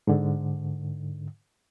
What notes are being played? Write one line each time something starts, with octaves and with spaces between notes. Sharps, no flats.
G#2 D3